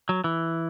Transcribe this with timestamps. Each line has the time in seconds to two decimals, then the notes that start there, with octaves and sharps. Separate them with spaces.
0.09 F#3
0.24 E3